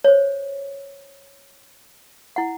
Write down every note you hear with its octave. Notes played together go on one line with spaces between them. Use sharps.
C5 C#5
E4 F#5